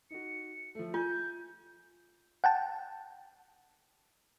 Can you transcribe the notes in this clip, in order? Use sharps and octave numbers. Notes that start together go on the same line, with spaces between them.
D#4 F#4 C#7
F3 A3
F4 G#5 G6
F#5 G5 A5